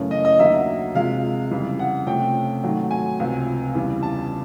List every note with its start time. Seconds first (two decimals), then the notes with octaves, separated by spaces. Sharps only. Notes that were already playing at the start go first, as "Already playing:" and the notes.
Already playing: F#2 C#3 E3 A3 C#4
0.11 D#5
0.25 D#5
0.39 D#2 D3 F#3 A#3 E5
0.95 C3 F3 G#3 F5
1.51 F2 C#3 E3 G3
1.79 F#5
2.07 C3 F3 A3 C#4 G5
2.63 G#2 D#3 F#3 A3
2.91 G#5
3.19 C#2 C3 F3
3.75 E2 C#3 E3 G3
4.03 A5